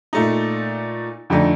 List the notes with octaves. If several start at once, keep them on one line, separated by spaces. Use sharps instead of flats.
A#2 A3 D#4
F2 D3 A3 D#4